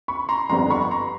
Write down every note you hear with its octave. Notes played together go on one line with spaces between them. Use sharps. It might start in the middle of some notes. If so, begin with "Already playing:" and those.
B5 C#6
A#5 C6
G1 F2 D3 G3 B3 A#5 C6
B5 C#6
A#5 C6